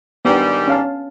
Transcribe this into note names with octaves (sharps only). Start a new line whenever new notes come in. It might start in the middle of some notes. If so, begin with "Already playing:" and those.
G#2 D#3 G3 B3 D4
C#4 F5 A5